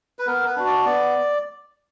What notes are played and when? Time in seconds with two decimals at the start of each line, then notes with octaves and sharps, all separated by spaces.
0.19 B4
0.27 B3 A#4
0.47 B4
0.56 D4 F#4
0.66 D5
0.86 B3 D5